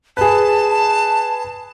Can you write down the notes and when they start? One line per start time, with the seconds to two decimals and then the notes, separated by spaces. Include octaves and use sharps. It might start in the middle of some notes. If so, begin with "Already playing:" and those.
0.17 G#4 B4 A5